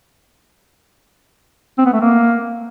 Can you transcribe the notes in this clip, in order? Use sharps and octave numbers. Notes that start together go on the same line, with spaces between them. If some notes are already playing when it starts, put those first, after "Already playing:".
C4
B3
A3
A#3